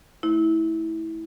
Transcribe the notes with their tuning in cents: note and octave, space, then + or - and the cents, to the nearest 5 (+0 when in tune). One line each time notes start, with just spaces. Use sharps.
A3 +0 E4 -20